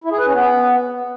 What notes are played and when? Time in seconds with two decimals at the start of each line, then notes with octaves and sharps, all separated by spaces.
0.04 E4
0.11 G#4
0.19 B4
0.26 C#4
0.34 B3